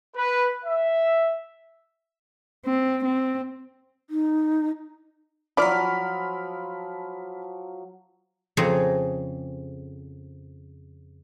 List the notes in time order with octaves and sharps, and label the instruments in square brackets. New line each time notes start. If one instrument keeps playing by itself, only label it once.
[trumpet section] B4
E5
[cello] C4
C4
[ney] D#4
[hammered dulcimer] F3 F#3 [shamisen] E4 D5 [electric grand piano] B5 F6 B6
[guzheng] F2 C#3 C4 G#4 C#5 A#5